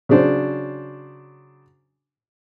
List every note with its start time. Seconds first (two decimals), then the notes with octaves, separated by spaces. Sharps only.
0.09 C#3 F#3 D4 C5